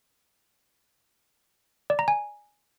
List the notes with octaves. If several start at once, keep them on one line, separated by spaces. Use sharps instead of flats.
D5
A#5
G#5